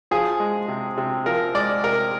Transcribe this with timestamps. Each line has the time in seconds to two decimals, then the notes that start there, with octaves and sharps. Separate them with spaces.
0.11 F3 G#4
0.40 G#3
0.68 C3
0.98 C3
1.26 F3 A#4
1.55 G#3 D5
1.84 C3 A#4